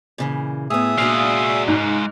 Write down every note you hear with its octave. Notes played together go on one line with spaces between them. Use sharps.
A#2 C#3 E3
A2 B3 G#4 E5 D#6
A#2 G#3 D4 F#4 F5
G#2